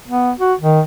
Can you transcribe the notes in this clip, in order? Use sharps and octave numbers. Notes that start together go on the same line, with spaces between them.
B3
F#4
D#3